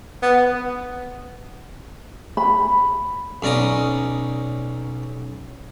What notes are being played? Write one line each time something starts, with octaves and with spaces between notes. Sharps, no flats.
B3
B5
B1 C#4 D5 A#5 D#6